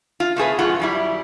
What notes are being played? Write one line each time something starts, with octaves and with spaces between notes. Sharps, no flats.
F4
C3 A3 G#4 B4
F#2 A2 F4 F#5
F#2 G3 E4